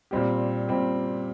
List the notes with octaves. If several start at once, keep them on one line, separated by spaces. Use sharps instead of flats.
A#2 G3 C4 G4
A#2 G3 C4 G4